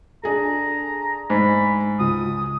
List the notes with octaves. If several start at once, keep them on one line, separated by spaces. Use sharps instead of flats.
D4 G#4 A4 A#5
G#2 B5
C#2 D#6